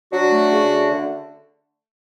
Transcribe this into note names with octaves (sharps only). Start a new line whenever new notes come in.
F#3 D4 F#4
A3
C#3
A3
D3